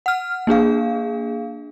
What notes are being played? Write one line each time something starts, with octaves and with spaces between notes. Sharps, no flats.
F#5 F6
A#3 D4 G#4 F5